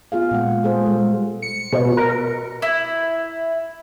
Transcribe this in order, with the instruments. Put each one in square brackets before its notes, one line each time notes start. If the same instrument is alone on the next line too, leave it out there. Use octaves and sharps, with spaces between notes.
[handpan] B3 F4 G#4 F5
A#2 G#3 F#5
G#3 G#4 A4 C5
G3 G#3
[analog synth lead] C#7
B2
A#4
[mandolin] E4